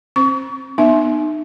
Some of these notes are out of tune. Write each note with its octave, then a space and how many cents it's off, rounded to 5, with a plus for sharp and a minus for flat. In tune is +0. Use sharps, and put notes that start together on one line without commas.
C4 +30 C5 +0 C#6 +35
B3 -10 D#4 -30 E5 +0